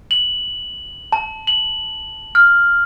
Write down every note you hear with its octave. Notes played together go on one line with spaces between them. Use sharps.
F#7
A5
F#7
F6